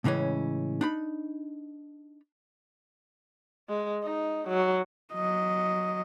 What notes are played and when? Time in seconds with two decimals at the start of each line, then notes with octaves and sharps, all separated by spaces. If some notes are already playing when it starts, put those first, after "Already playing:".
0.04 A2 C#3 E3 G#3 C#4
0.81 D4 D#4 B5
3.69 G#3
4.04 D#4
4.48 F#3
5.14 F#3 D#5